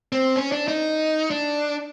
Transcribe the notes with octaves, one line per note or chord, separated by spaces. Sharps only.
C4
C#4
D4
D#4
D4